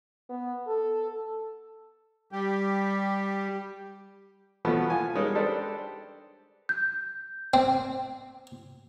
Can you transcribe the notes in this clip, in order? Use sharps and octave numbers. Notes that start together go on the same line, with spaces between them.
B3
A4
G3 G4
B2 F3 F#3 A3 B3
F4 G#5 A5
G3 G#3 C#4 D#4 A#4
D4 G4 A4 B4 C5 D5
G6
C4